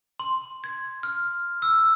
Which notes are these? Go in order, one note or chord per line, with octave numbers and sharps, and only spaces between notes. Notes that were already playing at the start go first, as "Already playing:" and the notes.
C6
G#6
F6
E6